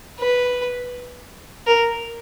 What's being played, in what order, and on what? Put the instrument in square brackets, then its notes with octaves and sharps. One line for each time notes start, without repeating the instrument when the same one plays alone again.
[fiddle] B4
A#4